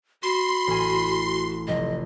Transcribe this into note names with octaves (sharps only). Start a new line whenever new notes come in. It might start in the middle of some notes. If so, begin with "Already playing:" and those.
F#4 B5 C6
A1 G#5
F1 D#5